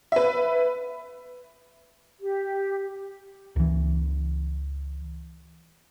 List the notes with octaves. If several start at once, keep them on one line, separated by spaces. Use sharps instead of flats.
B4 E5
G4
C#2 E3